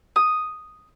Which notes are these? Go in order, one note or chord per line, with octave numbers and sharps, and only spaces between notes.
D#6